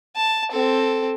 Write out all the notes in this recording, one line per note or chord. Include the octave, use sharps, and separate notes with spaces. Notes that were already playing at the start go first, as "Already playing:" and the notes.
A5
C4 A4